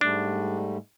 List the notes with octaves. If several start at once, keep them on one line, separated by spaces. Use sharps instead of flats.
G#2 G3 A3 D4